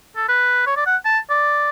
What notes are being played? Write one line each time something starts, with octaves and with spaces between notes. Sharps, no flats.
A4
B4
C#5
D5
F#5
A5
D5